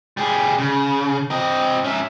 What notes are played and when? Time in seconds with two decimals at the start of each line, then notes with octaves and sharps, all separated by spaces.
0.17 G3 G#4
0.58 C#3
1.31 C4 D#5
1.84 C#4 E5